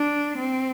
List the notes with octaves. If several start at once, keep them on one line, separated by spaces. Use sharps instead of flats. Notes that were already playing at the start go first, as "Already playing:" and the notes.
Already playing: D4
C4